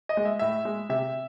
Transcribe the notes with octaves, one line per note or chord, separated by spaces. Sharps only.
D#5
G#3
E5
A2 E5
G#3
C3 E5